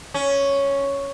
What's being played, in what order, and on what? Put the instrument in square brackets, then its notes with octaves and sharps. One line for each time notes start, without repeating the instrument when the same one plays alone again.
[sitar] C#4